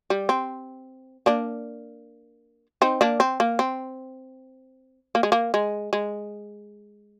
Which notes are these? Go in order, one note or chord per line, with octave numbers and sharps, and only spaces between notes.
G3
C4
A#3 D4
C4 D#4
A#3 D4
C4
A#3
C4
A#3
G#3
A#3
G#3
G#3